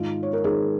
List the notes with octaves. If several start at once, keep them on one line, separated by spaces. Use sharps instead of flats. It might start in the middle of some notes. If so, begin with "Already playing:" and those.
Already playing: G#2 D#3 F4
C#5
A#4
G#2 D#3 G#4